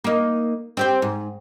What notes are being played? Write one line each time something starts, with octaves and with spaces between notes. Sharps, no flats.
A#3 D#4
C4 G4 C5
G#2